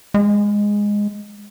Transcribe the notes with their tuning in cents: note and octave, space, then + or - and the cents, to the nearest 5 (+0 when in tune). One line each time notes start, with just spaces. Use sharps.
G#3 -10